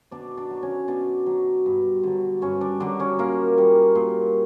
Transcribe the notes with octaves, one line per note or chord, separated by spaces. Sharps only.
B2 D4 D5
D4 D5
F#3
C#4 C#5
B2 D4 D5
F#3
G2
D3 F#3
G2 C#4 C#5
D4 D5
D3 F#3 D4 D5
C#4 C#5
A#2 A#3 A#4
G3
A#2